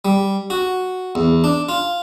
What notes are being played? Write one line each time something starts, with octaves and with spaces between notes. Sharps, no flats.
G3
F#4
E2
D4
F4